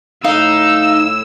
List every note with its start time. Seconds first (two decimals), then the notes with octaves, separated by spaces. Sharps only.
0.24 A2 D#4 F5 E6